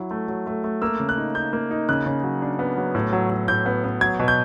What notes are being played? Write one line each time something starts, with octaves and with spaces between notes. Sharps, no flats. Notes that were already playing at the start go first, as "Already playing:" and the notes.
Already playing: F#3 E4
A3
F#3
A3
A3
A#3 E6
C#3
F#6
D#4
D#4 G6
A#3
D#4
C#3 F#6
C#3
F#3
D4
B3
F#3
A2
F#3
F#3
A2 G6
B3
B3
F#3 G#6
B2
G6